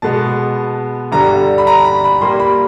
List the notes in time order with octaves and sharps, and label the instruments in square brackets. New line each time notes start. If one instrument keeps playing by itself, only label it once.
[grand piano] B2 G#3 B3 A5
G2 D3 G3 A#5
B5
A#5
B5
B5
A#2 G3 A#3 C6
B5